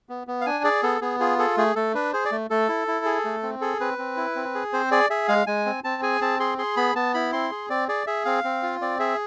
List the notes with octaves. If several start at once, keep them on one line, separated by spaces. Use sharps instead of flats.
B3
B3
F5
D4 G#5
G#4 D5
B3 A4
B3 G#4
F4 G#4
G#4 A4
A3 G#4
A3 A4
D4 B4
G#4 C5
D5
A3
A3 A4
E4
E4
G#4
A3
C4
G#4 A4
C4 B4
C4
E4
C4
G#4
C4 C5
G#4 D5
G#4 E5
G#3 F5
G#3 G#5
C4
C4 A5
G#4 G#5
C4 A5
G#4 C6
G#4 C6
B3 B5
B3 A5
E4 B5
C4 C6
G#4
C4 D5
G#4 D5
G#4 E5
C4 F5
C4
F4
C4 D5
G#4 E5